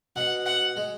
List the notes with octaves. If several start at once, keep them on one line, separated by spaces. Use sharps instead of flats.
B2 F#5
F#5
G#3